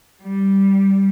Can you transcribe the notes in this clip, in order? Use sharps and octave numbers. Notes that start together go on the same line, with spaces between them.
G3